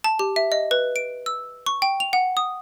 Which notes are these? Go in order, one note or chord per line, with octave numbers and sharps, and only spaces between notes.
A5
G4
E5
D#5
B4
D7
E6
C#6
G5
F7
F#5
D#6